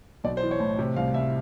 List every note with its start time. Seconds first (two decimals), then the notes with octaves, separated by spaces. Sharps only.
0.24 B1 D5
0.37 C5
0.42 E3
0.51 C#5
0.60 A2
0.78 C3
0.96 C2 F5
1.14 C2 E5